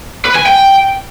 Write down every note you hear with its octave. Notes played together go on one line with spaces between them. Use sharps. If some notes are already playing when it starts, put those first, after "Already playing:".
B4
G#5
G5